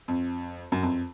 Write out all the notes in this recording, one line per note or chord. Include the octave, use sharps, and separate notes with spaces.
F2
F#2
F2